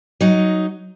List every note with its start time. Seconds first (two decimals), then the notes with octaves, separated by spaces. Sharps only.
0.21 F#3 D#4